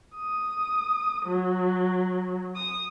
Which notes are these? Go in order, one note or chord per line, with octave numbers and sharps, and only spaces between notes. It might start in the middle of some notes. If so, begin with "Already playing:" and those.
D#6
F#3
D#6